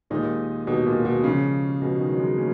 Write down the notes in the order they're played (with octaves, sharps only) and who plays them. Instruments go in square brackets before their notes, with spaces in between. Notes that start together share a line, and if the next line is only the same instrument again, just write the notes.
[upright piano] D#2 D#3 G#3 D#4 [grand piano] A#2
[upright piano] D#2 D#3 G#3 D#4 [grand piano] B2
[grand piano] A#2
B2
[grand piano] C#3 [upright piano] F3 G#3 C#4
[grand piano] B2 [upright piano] F3 G#3 C#4
[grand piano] D#3
F#3
G#3
[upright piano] F3 A#3 C#4